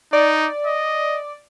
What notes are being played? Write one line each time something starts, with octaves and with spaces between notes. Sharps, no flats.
D#4 D5
D#5